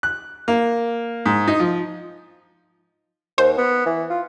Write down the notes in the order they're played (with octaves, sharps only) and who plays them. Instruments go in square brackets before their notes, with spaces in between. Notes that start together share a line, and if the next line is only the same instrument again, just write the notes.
[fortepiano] F#6
A#3
G#2
D#4
F3
[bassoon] D#2 [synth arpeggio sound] C5
[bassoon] B3
E3
F4